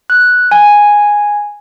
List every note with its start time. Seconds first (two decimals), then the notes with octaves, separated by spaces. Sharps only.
0.10 F#6
0.51 G#5